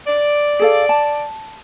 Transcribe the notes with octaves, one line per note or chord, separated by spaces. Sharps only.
D5
G#4 A4 F5
A5